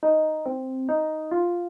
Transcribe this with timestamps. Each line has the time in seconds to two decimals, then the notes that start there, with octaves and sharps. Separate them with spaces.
0.03 D#4
0.46 C4
0.89 D#4
1.31 F4